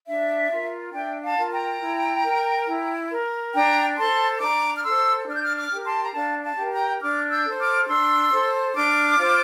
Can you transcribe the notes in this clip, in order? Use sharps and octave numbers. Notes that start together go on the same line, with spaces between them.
D4 E5
F4 A#4
D4 E5 G5
F5 A5
F4 A#4
G5 A#5
E4
A#4
E4
A#4
D4 G5 A#5
A4 C5 A5 C6
D4 A#5 D6
F6
A4 C5 C6 E6
D4 F6
G6
D6 F6
D6 F6
G4 A#4
A5 C6
A#5
D4 F5 A5
F5 A5
G4 A#4
G5 A#5
D4 D6 F6
E6 G6
A4 C5
D6 F6
D4 C6 E6
A4 C5
D4 D6 F6
F4 C5